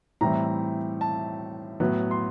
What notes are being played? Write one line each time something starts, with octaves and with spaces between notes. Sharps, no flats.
A2 E3 G3 C4 E4 A#5
A5
A2 F#3 B3
C6